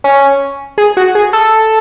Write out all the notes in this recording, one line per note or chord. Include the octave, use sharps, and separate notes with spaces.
C#4
G#4
F#4
G#4
A4